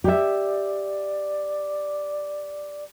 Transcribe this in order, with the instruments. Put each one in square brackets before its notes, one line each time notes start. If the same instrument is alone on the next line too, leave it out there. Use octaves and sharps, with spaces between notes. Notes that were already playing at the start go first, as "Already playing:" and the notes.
[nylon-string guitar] G4 E5 [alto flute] D5